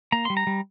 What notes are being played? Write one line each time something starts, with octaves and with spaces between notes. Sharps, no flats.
A#3 A#5
G3 C6
A#5
G3